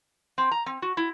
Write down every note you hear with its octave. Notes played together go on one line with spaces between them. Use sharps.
C4
A#5
C4
F#4
E4